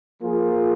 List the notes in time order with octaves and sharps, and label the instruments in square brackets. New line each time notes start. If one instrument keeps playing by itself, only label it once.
[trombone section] F3 A#3 F4 G#4